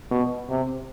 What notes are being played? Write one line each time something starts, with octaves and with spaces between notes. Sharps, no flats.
B2
C3